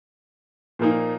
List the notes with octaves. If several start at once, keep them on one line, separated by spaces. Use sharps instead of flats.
A#2 F3 A#3 D#4